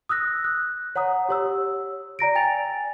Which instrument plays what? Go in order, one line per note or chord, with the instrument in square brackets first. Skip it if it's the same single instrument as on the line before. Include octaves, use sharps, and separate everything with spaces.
[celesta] D#6 E6 F#6 A#6
F#6
C#5 F#5 A#5 D#6
G4 C#5 E6
D5 A#5 A#6 D7
G5 G#5 A6 F7